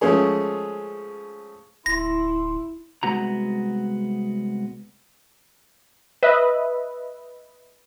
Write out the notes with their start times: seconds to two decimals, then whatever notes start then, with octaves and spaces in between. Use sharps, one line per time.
0.01 F3 G#3 A3 C#4 G#4
1.86 D1 E4 C6 A#6
3.03 C2 G2 G#3 B3 F#4 A#5
6.23 B4 D#5 E5